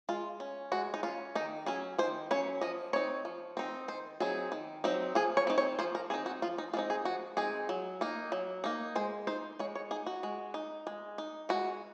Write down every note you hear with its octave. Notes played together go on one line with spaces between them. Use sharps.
G#3 F4
C#4
G#3 F#4
D#4
C#4 F4
D#3 D#4
F#3 C#4 G#4
D#3 C5
F#3 C#4 C#5
F3 D#5
C4 D#4 C#5
F3
C4 D#4
D#3 C5
F#3 C4 D#4 G#4
D#3
F#3 C4 D#4
F3 G#4
C#5
C4 D#4
C#5
F3 C5
A#4
C4 D#4 G#4
F#4
F3 F4
D#4
G#3 C4 D#4 F4
G#4
F3 F#4
G#3 C4 D#4 G#4
F#3
A#3 D#4
F#3
A#3 D#4
G#3 C5
D#4 C5
G#3 C#5
C#5
D#4 G#4
F#4
G#3
D#4
G#3
D#4
G#3 F#4